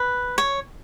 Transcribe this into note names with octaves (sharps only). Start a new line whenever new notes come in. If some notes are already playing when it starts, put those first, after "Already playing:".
Already playing: B4
C#5